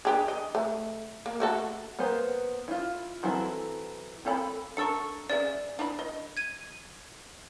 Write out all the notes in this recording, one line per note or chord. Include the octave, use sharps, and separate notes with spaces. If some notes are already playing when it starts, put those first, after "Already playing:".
D4 G4 G#4
D#5
A3
A#3
A3 F#4 A4
A#3 B3 B4 C5
E4 F4
E3 F#3 C4 E4 A4
C4 G4 A4 A#5 B5
D4 A4 A#4 C#6 E6 C#7
C#4 G#4 D5 E5
D4 E4 B5
D#5
G#6 D#7